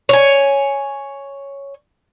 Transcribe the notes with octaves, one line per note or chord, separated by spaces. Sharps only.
C#5 G#5